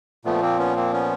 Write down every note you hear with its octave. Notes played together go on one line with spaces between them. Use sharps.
A#2 F3 A3 B3
A#3 C4
B3 C#4
A#3 C4
B3 C#4